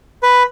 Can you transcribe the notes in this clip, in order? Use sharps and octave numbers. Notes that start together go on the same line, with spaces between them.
B4